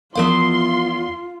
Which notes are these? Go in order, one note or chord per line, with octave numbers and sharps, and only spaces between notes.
E2 F3 B3 F4 A#4 E5 F5 C6